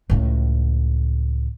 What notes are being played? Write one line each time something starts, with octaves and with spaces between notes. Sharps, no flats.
C#2 A2